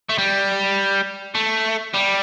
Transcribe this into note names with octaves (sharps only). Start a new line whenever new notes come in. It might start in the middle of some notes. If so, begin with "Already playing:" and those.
A3
G3
A3
G3